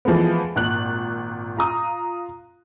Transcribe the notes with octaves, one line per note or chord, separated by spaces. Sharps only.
E3 F3 G#3 A3 B3
G#1 A#2 F#6 F#7
F4 A#5 D#6